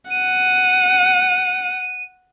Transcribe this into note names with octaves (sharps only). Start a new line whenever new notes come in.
F#5 D#7